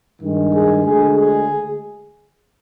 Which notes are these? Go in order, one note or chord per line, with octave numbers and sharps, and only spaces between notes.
G2 D#3 G#3
G#4
D2 D3 G#3 G#4
G#4